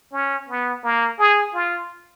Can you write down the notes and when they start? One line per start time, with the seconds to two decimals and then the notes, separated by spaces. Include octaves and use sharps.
0.13 C#4
0.49 B3
0.84 A#3
1.19 G#4
1.54 F4